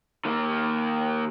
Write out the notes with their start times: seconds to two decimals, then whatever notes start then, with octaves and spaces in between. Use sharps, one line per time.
0.25 D#3 A#3